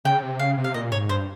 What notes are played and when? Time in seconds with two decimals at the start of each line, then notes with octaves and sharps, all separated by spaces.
0.05 C#3 G5
0.22 C3
0.39 C#3 F5
0.57 C3
0.64 F5
0.74 A#2 D#5
0.92 G#2 C#5
1.09 G2 C5